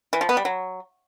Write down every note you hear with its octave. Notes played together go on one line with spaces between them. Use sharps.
E3
F3
B3
G3
F#3